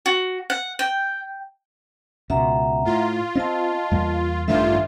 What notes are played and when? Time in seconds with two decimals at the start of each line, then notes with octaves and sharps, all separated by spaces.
0.06 F#4
0.50 F#5
0.79 G5
2.30 C#2 B2 E5 F#5 A#5
2.85 A2 F4
3.35 C4 D#5 A5
3.91 E2 G3 A#3
4.48 A1 G2 D#3 A3 F4 E5